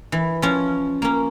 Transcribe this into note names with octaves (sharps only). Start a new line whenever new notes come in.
E3
F3 C#4
A#3 C#4